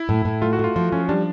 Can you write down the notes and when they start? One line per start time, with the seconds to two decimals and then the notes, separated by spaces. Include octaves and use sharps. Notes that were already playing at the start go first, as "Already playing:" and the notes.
Already playing: E4
0.09 A2
0.25 A2
0.42 A3 F4
0.53 F#4
0.59 A3
0.64 F4
0.76 F3 F4
0.92 F3 C#4
1.09 G3 D4